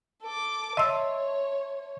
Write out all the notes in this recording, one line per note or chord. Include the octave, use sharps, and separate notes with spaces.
A4 D6
C#5 D#5 E5 A5 C6 E6